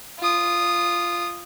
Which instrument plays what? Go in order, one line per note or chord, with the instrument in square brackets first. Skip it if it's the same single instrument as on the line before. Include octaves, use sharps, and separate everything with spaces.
[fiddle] F4 D#6